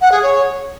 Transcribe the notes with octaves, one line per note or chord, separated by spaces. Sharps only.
F#5
G#4
C#5